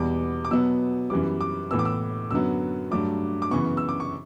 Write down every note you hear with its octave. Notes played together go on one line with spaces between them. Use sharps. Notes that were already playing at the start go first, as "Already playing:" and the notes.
Already playing: E2 B2 G3 B3 D6
D6
B2 F#3 B3 E6
F#2 E3 G3 B3 D6
D6
A2 E3 B3 E6
D6
E6
F#2 D3 F#3 B3 E6
G2 F#3 A3 D6
D6
F#2 C#3 E3 B3 C#6
E6
D6
C#6